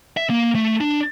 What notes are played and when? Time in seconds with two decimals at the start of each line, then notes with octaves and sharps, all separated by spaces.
0.17 E5
0.30 A#3
0.55 A3
0.81 D4